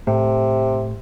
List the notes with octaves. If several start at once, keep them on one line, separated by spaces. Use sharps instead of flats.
A2 C3